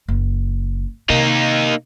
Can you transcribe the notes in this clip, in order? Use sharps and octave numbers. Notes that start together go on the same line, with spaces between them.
F#1
C3 A#3 D#4